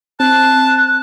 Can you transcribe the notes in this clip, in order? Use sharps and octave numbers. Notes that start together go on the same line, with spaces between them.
C4 A5 F#6